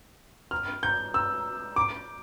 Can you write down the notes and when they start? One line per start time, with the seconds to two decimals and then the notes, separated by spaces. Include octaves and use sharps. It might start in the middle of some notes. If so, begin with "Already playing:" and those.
0.51 F6
0.83 G6
1.14 E6
1.76 D6